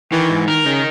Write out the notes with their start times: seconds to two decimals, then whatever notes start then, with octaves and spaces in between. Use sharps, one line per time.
0.12 D#3 E3
0.30 G#2
0.47 D#3 A#4
0.65 C#3 D#4